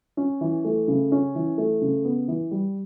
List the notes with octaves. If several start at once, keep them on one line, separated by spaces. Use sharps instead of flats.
C#4
E3
A3
C#3
C#4
E3
A3
C#3
B3
E3
G3